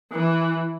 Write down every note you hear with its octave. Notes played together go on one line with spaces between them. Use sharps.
E3